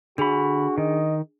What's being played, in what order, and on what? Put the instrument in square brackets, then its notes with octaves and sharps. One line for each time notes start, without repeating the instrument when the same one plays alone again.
[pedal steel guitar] D3 B5 [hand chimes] D4 G#4 [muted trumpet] F#4
[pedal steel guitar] D#3 [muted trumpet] D#5